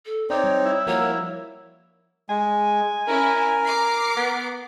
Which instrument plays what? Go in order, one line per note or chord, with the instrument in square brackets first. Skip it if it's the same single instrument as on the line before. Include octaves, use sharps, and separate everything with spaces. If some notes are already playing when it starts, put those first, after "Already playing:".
[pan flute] A4
[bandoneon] C4 D#4 [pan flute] C#5 [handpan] D5
[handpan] G3
[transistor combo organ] E4
[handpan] F3 F#4 A#4 [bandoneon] A#3 [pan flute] C#5
[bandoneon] G#3 [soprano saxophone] G#5
[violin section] C#4 E4 [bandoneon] A#4
[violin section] A#5 D6 C7
[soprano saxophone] B3